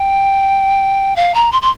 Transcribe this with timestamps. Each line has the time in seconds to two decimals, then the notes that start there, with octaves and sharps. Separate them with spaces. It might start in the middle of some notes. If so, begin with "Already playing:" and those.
Already playing: G5
1.16 F5
1.34 A#5
1.52 C6
1.62 C6